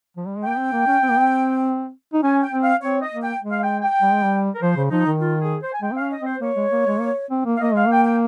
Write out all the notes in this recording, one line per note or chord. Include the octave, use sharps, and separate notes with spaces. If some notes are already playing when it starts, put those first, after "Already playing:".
F3
G3
G#3
G5
A#3
C4
A#3
C#4
C4
A#3
C4
D#4
C#4 G#5
G5
C4
F5
C4 C#5
D#5
A#3
G5
G#3
F5
G5
G5
G3
G#3
G3
A#4
F3 C5
C#3
F3 D#4
D#3
F4
G#4
C5
G#5
G#3 G5
C4
C#4 F5
D#5
C4
C5
A#3 C#5
G#3
A#3
G#3
A#3
C4
A#3
F5
A#3 D#5
G#3 F5
A#3 G5
G5